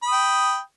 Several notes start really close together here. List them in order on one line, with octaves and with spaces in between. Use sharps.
B5 D#6 G5